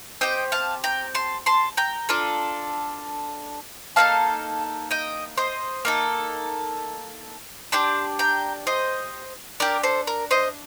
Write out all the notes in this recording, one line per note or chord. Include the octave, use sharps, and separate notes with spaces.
C4 G4 D#5 G5
F5 A5
G5 A#5
A5 C6
A5 C6
G5 A#5
D4 F4 A4
A#3 D#4 A4 F5 A5
D#5 G5
C5 D#5
A#3 D#4 A4
D4 G4 A5 C6
G5 A#5
C5 D#5
D4 G4 A#4 D5
A4 C5
A#4
C5 D#5